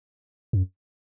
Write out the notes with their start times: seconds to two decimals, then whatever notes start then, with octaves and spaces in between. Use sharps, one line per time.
0.53 F#2